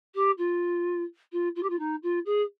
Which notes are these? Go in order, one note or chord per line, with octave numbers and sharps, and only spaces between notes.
G4
F4
F4
F4
G4
F4
D#4
F4
G#4